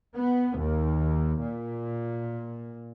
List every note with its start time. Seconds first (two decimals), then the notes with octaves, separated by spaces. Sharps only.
0.16 B3
0.59 D#2
1.43 A#2